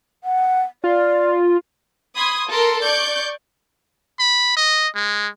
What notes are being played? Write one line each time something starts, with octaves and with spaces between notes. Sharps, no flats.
F#5
F4 D5
B5 C6 D#6 G#6
A4 A#4 C6
D5 C#6 G6
B5
D#5
G#3